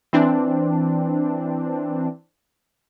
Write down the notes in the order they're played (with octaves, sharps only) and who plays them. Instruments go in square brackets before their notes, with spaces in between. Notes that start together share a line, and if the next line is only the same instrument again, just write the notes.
[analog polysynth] E3 C4 D4